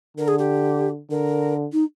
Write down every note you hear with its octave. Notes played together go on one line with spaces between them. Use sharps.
D3 A#4
G#4
G4
D3 A#4
D#4